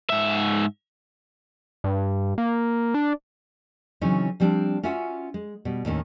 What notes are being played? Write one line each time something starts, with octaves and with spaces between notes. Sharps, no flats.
G#2 E5
G2
A#3
D4
C#3 E3 F#3 C4 C#4 D#4
F3 G3 C4 D4
C#4 F4 F#4 E5 F#5 G#5
G#3
B2 G3
D#2 A2 D#3 C#4